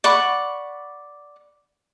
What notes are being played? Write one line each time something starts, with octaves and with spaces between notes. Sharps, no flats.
D5 F#5 B5 C#6